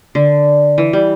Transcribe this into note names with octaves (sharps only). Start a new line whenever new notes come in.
D3
E3
G3